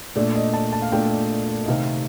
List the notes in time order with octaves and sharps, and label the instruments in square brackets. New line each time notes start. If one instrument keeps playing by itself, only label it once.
[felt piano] A#2 A3 D4 D5
D#5
A5
A5
F5
A#2 A3 D4 G5
D#5
C3 D#3 A3 C4 F5